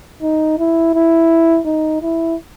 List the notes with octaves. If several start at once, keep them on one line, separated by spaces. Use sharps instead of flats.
D#4
E4
E4
D#4
E4